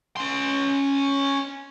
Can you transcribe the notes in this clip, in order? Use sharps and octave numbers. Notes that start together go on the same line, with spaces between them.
C#4 C6